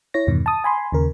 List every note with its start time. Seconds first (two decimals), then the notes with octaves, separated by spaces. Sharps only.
0.14 E4 C#5 A#6
0.27 E2 G2 B2 D#3
0.46 A5 D#6
0.64 G#5 B5 C6
0.92 D#2 C#3 A#4